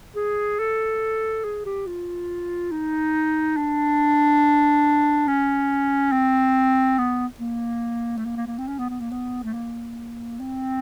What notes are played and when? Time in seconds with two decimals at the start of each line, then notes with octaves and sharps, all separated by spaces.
0.15 G#4
0.59 A4
1.44 G#4
1.66 G4
1.87 F4
2.71 D#4
3.57 D4
5.27 C#4
6.12 C4
6.98 B3
7.40 A#3
8.17 A3
8.26 A#3
8.36 A#3
8.47 A#3
8.58 C4
8.68 C#4
8.78 B3
8.90 B3
9.00 A#3
9.11 B3
9.43 A3
9.53 A#3
10.39 C4